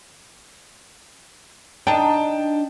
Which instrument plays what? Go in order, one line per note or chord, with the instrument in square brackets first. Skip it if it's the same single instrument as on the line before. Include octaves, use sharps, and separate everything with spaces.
[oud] D4 D#4 [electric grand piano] G5 A5